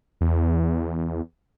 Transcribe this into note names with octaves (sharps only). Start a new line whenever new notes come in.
E2